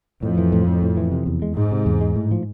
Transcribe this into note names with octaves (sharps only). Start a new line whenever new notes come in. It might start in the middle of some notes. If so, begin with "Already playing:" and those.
F2 A2
E3
A2
A2
A2
E3
C3
E2
G#3
G#2 G#3
C3
E2
G#3
A2
F3